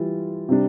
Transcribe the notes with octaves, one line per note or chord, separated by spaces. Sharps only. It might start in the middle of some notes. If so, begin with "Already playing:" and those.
Already playing: E3 G3 F4
C3 G3 D4